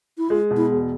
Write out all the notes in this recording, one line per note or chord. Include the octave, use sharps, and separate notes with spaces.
E4
G#3 F4
B2
E4
E1